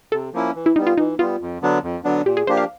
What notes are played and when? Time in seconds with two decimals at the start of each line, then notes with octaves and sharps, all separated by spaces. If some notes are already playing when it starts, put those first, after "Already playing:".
0.12 C3 A4
0.33 F3 A#3 C#4 E4
0.55 E3
0.66 E4
0.76 G3 B3 D#4
0.87 F4
0.97 E3 D#4
1.19 G3 B3 F4
1.41 F2
1.62 D3 F#3 B3 D4
1.83 F2
2.04 D3 F#3 B3 D4
2.25 A#2 G4
2.37 G#4
2.47 F3 A#3 D4 G4 C5
2.57 F5